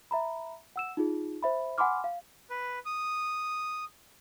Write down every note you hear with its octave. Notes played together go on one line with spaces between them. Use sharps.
E5 A#5 B5
F#5 E6 E7
D#4 F4 G#4
C5 E5 B5
F#5 G#5 B5 C6 D6 F6
F5
B4
D#6